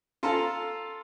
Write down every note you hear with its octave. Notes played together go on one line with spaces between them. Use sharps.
F4 A4 F5 A5 A#5